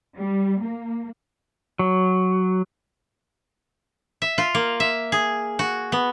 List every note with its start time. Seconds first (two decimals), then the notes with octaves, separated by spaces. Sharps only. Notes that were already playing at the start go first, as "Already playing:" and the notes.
0.17 G3
0.63 A#3
1.79 F#3
4.22 E5
4.38 F4
4.55 A#3
4.80 E5
5.12 G#4
5.59 F#4
5.92 B3